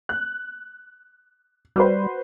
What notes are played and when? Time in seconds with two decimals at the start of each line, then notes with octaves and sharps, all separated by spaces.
0.09 F#6
1.76 G3 F#4 B4 C5